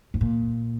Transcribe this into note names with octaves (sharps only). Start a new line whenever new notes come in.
G#2
A#2